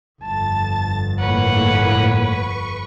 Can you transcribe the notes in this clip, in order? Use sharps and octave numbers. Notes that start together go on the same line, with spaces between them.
G1 F2 A5 A6
A2 A#3 B4 C#5 F#5
C#6